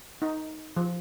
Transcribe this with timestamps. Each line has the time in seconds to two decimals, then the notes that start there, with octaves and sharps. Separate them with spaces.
0.22 D#4
0.77 F3